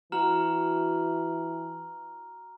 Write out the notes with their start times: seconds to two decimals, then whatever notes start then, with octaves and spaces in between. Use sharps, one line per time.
0.12 E3 F#4 A#5 F6 F#7